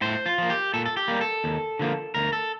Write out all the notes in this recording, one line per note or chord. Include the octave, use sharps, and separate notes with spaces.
A2 C5
F4
F3 A#3
G4
A#2 A4
A4
G4
G3 A#3
A4
D#2
D3 F3 A#3
D2 A#4
A4